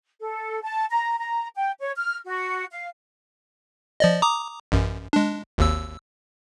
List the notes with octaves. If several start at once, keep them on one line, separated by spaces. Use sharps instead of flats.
A4
A5
A#5
A#5
G5
C#5
F6
F#4
F5
F3 D5 D#5
A#5 D6 D#6
A1 F#2
G#3 D4
G#1 D#2 E6